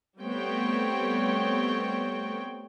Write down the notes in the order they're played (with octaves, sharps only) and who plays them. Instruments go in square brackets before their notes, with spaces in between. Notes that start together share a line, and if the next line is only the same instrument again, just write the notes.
[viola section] G3 A3 B3 C4 C#5 G5